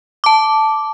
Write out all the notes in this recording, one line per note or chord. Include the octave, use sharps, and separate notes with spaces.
A5 D6